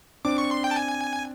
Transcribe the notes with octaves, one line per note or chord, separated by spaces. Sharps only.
C4 D4 D6
C#6
C6
G5
A5
G#5